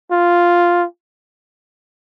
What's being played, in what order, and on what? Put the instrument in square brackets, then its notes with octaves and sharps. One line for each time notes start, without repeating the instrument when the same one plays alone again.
[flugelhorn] F4